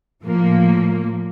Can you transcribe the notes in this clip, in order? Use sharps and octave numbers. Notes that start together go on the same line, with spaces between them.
A2 F3 A#3